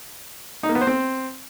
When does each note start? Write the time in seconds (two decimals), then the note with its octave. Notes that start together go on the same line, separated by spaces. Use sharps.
0.63 D#4
0.69 A#3
0.75 B3
0.81 C5
0.87 C4